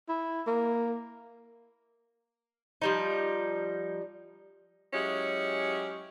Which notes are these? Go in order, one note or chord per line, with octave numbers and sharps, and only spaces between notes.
E4
A#3
F3 G3 D#4
F#3 G#3 C#4 E4 G4